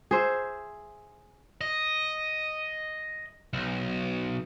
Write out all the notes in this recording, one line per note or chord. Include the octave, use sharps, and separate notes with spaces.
G#4 C5 E5
D#5
B1